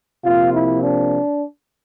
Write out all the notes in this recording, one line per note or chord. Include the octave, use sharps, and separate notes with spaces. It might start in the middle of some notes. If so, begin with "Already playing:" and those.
C3 F3 A#3 F4
E4
D4